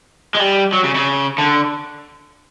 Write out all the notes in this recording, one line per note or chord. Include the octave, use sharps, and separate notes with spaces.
G#3
G3
F#3
C#3
C#3
D3